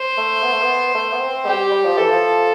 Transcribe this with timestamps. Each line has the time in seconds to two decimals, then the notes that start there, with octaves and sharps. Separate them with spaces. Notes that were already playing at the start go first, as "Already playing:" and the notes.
Already playing: C5
0.17 A3
0.43 B3
0.52 A3
0.62 B3
0.94 A3
1.12 B3
1.20 C4
1.46 G3 G4
1.71 G3
1.85 F3
1.97 E3 A4
2.11 F3